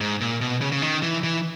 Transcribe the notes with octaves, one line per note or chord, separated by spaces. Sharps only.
G#2
A#2
B2
C#3
C#3
D#3
E3
E3